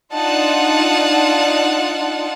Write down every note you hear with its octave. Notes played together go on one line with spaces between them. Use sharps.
D4 D#4 F4 F#5 A5